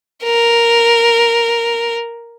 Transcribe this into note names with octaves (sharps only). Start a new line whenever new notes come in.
A#4